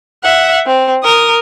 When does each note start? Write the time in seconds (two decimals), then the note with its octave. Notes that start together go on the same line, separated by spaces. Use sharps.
0.23 E5 F#5
0.66 C4
1.04 A#4 D#6